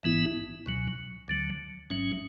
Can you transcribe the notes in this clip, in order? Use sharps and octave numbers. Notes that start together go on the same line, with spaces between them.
A1 G#2 E3 B3 E4
C#2 B2 F#3
D2 D3 F#3
A1 G#2 F#3 C#4